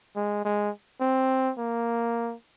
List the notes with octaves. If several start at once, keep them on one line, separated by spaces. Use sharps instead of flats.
G#3
G#3
C4
A#3